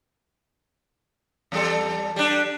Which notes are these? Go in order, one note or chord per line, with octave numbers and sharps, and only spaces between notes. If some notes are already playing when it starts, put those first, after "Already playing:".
E2 G3 A4
G3 D4